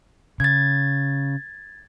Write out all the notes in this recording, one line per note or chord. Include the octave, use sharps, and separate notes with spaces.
C#3 G#6 A6